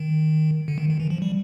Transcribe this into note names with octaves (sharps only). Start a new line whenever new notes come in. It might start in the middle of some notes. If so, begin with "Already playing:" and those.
Already playing: D#3
D3
D#3
D#3
E3
F3
G3